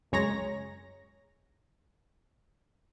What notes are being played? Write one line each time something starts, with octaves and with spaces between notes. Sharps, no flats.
C#2 F#2 G#3 C#5 A#5 A#6